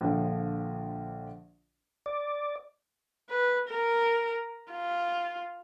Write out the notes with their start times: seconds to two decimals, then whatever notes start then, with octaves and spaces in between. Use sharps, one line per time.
0.01 A#1 D3 F3
2.06 D5
3.30 B4
3.69 A#4
4.72 F4